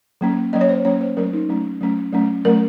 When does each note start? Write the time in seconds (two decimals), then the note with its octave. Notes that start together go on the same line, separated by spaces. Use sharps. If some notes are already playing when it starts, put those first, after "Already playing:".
0.21 F#3 A#3 C#4
0.53 F#3 A#3 C#4 D#5
0.61 C#5
0.69 C5
0.85 F#3 A#3 C#4 C#5
1.01 C5
1.17 F#3 A3 C#4 A#4
1.33 D#4
1.49 F#3 A3 C#4
1.81 F#3 A3 C#4
2.13 F#3 A3 C#4
2.45 F#3 A3 C#4 A#4